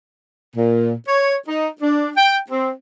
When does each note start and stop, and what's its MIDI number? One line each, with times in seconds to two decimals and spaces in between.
0.56 0.93 46
1.08 1.37 73
1.48 1.70 63
1.81 2.10 62
2.16 2.37 79
2.50 2.72 60